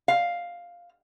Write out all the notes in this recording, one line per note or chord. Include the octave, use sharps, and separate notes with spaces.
F5